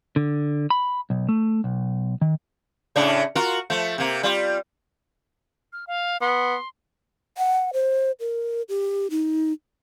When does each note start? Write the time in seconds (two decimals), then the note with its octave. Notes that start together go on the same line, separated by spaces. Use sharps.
0.16 D3
0.70 B5
1.10 B1
1.29 A3
1.64 B1
2.21 D#3
2.96 A2 C#3 D4
3.35 F4 F#4 A#4
3.70 F3 A3
3.98 C3 A#3
4.23 G3 F4
5.73 F6
5.87 F5
6.21 B3 C6
7.38 F#5
7.73 C5
8.20 A#4
8.69 G4
9.11 D#4